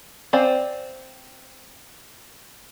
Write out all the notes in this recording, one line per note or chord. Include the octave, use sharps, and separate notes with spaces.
C4 C5 D5 F5 G#5